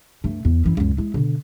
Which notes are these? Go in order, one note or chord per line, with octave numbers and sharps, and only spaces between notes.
G2 A3
E2
F#2 E3
C#2 F#2
G#3 E4
B2 D3